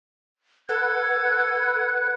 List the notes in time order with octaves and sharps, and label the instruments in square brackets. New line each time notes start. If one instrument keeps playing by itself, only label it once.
[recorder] A4 [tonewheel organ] B4 F#5 [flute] G#6